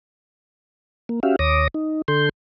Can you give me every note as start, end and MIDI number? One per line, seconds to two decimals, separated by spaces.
1.09 1.20 58
1.23 1.36 61
1.23 1.36 66
1.23 1.36 67
1.23 1.36 76
1.23 1.36 77
1.39 1.68 39
1.39 1.68 73
1.39 1.68 86
1.39 1.68 87
1.39 1.68 94
1.74 2.02 63
2.08 2.29 50
2.08 2.29 69
2.08 2.29 84
2.08 2.29 91